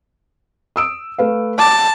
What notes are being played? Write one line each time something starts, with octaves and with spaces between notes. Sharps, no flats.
D#6 E6 D7
A3 B4 F5
A5 D6